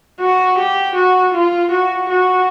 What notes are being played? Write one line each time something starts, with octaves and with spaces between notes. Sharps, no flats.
F#4
G4
F#4
F4
F#4
F#4